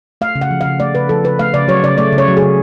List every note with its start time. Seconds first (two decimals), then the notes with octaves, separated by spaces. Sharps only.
0.21 A3 F5
0.35 C#3
0.41 F#5
0.51 F3
0.61 F5
0.66 C#3
0.80 A3 D5
0.95 C#3 B4
1.09 F3 A4
1.24 C#3 B4
1.39 A3 F5
1.54 C#3 D5
1.68 F#3 C#5
1.84 C#3 D5
1.98 A3 D5
2.13 C#3
2.18 C#5
2.28 F#3
2.37 G#4
2.42 C#3